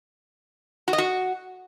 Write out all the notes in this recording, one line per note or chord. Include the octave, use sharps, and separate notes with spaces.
F#4
D#5
F#4